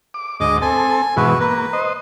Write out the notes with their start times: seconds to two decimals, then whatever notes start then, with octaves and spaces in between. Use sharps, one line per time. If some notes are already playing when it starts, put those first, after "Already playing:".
0.14 D6
0.40 D2 G#2 D#5 D6
0.62 C4 A4 G#5
1.17 G#2 B2 E3 F#4 B4
1.41 A#3 B4
1.73 C5 D#5